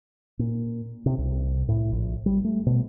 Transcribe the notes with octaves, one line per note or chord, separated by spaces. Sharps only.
A#2
C3
C2
A2
A#1
G3
A3
B2